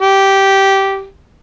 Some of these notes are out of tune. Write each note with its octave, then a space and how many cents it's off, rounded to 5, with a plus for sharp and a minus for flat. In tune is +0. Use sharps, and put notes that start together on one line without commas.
G4 -10